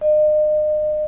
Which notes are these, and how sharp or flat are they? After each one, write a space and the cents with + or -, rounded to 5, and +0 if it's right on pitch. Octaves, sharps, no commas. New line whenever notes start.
D#5 -40